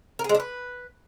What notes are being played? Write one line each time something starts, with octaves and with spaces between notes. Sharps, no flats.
A#4
G#4
G#3
D4
B4